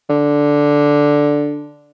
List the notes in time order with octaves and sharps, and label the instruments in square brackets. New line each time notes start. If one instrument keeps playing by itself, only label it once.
[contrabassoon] D3